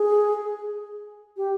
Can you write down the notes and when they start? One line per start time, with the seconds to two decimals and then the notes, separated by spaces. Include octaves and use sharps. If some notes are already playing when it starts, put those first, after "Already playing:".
Already playing: G#4
1.37 G4